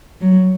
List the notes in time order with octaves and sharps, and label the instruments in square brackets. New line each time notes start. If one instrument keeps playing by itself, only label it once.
[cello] F#3